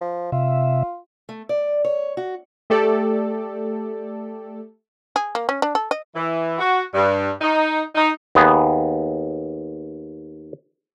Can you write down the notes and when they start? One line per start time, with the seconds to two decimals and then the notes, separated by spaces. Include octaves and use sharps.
0.01 F3
0.32 C3 F4 E5
1.29 A3
1.49 D5
1.85 C#5
2.17 F#4
2.70 A3 G4 A4 D5
5.16 G#4
5.35 A#3
5.49 C#4
5.62 D4
5.75 A4
5.91 D#5
6.15 E3
6.59 F#4
6.94 G2
7.41 D#4
7.95 D#4
8.35 D#2 B3 G#4